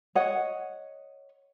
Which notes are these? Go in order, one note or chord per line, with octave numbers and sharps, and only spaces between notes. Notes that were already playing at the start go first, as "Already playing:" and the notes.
C#5 D#5 F#5